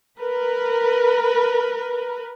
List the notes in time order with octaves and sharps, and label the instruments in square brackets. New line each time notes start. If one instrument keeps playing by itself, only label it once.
[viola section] A#4 B4